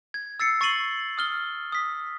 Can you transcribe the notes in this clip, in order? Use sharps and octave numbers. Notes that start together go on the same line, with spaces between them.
G#6
E6 A6 C7 C#7
C#6 A6 C7 D#7 F#7 G7
D#6 F6 G7
D#6 B6